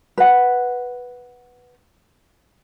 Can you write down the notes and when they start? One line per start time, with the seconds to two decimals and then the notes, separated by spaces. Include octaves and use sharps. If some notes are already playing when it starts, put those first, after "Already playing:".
0.18 B4 F#5